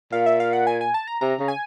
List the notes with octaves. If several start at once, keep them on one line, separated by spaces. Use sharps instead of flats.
A#2 F5
E5
F5
F#5
G#5
G#5
A5
A#5
C3 A#5
C#3
G#5